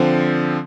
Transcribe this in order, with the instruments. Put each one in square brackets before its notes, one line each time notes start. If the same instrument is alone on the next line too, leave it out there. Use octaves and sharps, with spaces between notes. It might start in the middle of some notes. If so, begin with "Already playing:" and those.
Already playing: [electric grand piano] D3 F3 C4